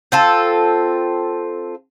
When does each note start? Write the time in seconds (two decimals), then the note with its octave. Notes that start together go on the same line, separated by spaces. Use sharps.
0.12 C4 F4 A4